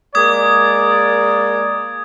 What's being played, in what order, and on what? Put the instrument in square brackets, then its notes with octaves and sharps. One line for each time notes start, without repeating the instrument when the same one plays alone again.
[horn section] G#3 A#3 D5 [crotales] D#6 G#6